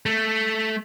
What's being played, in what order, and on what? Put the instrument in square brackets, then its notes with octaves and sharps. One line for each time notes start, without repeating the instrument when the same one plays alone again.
[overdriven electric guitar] A3